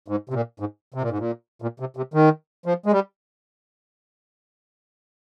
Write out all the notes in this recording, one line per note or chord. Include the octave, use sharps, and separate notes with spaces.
G#2
C3
A#2
G#2
C3
A#2
G#2
A#2
A#2
C3
C3
D#3
F3
G#3
G3